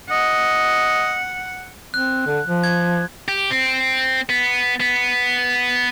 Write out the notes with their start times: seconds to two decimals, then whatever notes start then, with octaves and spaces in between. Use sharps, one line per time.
0.11 D#5 F#5
1.94 C4 F#6
2.26 D3
2.46 F3
2.63 G#6
3.28 G4
3.51 C4
4.29 B3
4.80 B3